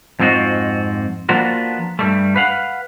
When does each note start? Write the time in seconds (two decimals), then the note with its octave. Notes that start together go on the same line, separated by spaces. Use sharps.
0.20 F2 G#2 C4 F4 F#4 D#5
1.29 F3 A#3 B3 D4 F4 F#4
1.99 G2 G3 A3
2.36 B4 F5 F#5